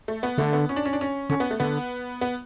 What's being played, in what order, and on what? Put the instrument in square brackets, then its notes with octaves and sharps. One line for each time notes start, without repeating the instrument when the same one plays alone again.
[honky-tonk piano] A3
B3
[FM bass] D3 [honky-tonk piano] A3
[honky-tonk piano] B3
C#4
D4
C#4
D4
C#4
[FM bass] D3 [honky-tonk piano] C#4
[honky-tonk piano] B3
A3
[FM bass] D3 [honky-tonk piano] B3
[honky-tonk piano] B3